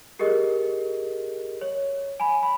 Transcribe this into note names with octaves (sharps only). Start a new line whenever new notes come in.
G4 G#4 A#4 D#5
C#5
G#5 B5
B5